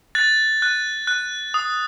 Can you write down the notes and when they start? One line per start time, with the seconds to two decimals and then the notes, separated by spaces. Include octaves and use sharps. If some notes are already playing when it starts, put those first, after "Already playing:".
0.15 F#6 A6
0.62 F#6
1.07 F#6
1.54 D#6